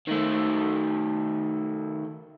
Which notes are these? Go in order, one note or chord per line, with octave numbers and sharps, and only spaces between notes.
D#3 A3